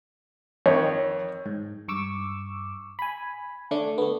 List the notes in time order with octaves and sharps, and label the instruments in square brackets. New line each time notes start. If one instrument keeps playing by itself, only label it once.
[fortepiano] F2 D#3 [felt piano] C#5
[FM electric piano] G#2
G2 C#6 D6 E6
G#5 B5
D3 A3 D4
A3 B3